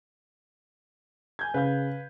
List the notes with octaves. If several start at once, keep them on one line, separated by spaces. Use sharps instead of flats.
G#5 G6 G#6
C#3 B4 F5 G6